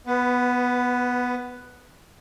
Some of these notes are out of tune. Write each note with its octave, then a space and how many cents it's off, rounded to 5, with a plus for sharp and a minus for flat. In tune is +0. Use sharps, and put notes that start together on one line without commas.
B3 +0 B4 +20